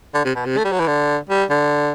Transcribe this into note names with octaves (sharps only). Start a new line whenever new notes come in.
D3
C3
B2
C3
A3
G3
F#3
E3
D3
G3
D3